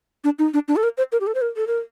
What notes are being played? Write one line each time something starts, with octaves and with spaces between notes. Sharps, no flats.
D4
D#4
D4
D4
A4
A#4
C5
A#4
G4
A4
C5
A#4
A4
A#4